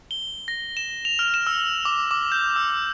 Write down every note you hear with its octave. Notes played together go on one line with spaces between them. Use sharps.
G7
A#6
E7
F7
F6
E7
E6
D6
D6
G6
E6